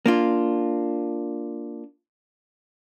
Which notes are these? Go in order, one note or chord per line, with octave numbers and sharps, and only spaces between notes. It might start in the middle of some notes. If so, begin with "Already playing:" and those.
A#3 D4 F4